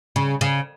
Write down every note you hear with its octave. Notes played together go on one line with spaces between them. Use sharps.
C#3
C#3